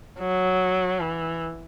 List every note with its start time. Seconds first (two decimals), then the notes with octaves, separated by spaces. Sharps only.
0.20 F#3
1.00 E3